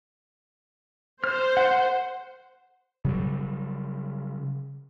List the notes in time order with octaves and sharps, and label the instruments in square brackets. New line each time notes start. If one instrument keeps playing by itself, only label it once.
[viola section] C5 [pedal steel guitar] F6
[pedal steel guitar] F#5
[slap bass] C#3 F#3 G3